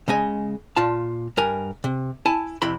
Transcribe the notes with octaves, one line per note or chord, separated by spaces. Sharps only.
C#3 G#3 D#5 G#5
A#2 F4 A5
G2 A#4 G#5
C3
E4 G#5 A5
F2 C3 E4 B5 C6